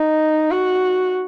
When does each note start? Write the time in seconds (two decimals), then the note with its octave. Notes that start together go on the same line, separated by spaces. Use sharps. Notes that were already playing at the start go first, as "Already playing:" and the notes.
Already playing: D#4
0.51 F#4